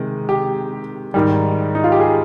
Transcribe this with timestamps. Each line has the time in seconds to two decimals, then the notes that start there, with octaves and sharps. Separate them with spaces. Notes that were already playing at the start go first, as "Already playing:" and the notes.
Already playing: C3 D#3 G#3
0.29 G4
1.14 G#2 D#3 G3
1.75 D#4
1.84 F4
1.92 G4
2.00 G#4